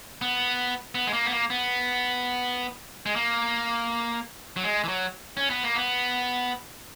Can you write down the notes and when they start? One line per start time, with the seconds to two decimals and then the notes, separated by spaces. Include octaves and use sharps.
0.22 B3
0.95 B3
1.07 G#3
1.13 A#3
1.25 B3
1.31 A#3
1.50 B3
3.06 G#3
3.16 A#3
4.56 F#3
4.64 G#3
4.84 E3
4.88 F#3
5.37 C#4
5.50 B3
5.63 A#3
5.76 B3